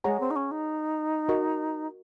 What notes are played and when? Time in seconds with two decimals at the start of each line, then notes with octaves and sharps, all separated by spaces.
0.04 G#3 G#4 C#5 F#5 A#5 C#6
0.20 C4
0.30 D#4
0.36 C#4
0.51 D#4
1.29 F#4 A#4 D#5 A#5 C#6